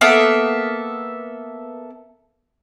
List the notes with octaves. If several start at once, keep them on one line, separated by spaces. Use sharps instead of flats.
A#3 B3 A4 E5